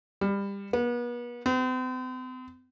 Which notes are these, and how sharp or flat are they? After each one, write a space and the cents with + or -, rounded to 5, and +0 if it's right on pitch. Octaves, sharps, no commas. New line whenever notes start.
G3 +25
B3 -40
C4 -45